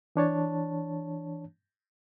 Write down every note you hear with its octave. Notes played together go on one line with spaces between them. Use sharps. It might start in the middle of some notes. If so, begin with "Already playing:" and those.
E3 D4 C#5 A5